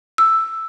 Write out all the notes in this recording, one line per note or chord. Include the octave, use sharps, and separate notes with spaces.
E6